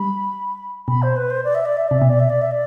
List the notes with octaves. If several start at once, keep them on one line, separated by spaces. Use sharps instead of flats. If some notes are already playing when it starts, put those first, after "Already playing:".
Already playing: G3 B5
B2 B5
C5
B4
C5
D5
E5
D5
E5
C3 D5
B2 E5
D5
E5
D5
E5
D5